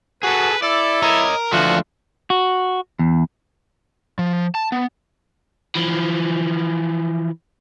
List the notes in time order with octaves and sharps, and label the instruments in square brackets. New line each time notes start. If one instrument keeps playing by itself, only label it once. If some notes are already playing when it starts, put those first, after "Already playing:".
[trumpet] F#4 [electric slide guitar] G#4 A4 [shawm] B4
[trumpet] E4 [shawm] A4 [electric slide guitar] D5
[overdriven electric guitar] A#4 [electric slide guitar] C#5 D#5
[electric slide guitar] D3 E3 F3 [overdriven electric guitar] A3 D4 [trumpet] F4 [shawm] F#4
[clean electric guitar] F#4
E2
[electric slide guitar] F3
A5
B3
[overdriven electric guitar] E3 F3